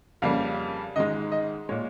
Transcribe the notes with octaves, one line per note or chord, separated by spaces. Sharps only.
F2 C#3 G3 A#3 F5
G#2 D#3 G#3 D#5
D#5
A#2 G#3 C#5